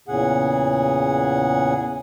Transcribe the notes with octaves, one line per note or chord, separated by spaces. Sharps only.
E2 A#2 C#3 G#4 F#5